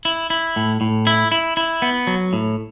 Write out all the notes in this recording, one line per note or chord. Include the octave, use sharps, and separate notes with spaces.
E4
E4
A2
A2
E4
E4
E4
B3
F#3
A2